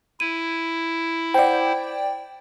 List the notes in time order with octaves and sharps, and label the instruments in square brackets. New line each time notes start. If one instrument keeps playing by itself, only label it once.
[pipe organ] E4 [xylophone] D#7
[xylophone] C5 F#5 [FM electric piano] D5 G5